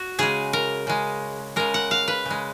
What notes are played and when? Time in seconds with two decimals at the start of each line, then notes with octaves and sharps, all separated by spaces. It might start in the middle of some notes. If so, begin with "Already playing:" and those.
Already playing: F#4
0.19 C#3 G#3 G#4
0.53 A#4
0.87 C#3 G#3
1.56 C#3 G#3 A#4
1.74 F#5
1.91 F5
2.08 B4
2.25 C#3 G#3